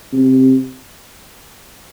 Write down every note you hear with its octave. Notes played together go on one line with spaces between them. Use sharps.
C3